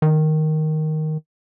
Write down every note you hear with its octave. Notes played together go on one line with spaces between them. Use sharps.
D#3